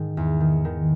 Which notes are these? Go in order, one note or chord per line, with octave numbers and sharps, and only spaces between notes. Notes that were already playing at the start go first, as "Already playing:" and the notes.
Already playing: G#2 D#3
E2
D#3
D#3